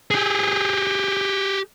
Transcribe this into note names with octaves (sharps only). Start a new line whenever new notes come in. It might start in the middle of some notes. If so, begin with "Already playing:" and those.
G4 G#4